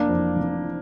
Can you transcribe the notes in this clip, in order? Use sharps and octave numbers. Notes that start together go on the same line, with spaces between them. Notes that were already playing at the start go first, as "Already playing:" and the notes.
Already playing: F1 A#3 D4
F2 E3
F1
E3